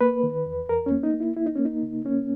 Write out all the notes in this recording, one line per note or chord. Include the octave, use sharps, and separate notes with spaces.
A#3 B4
D#3
E2
E2 A#4
C#4
A#3
D#4
A#3
E4
A#3 E4
D#4
A#3 C#4
D#4
C#3
A#3 C#4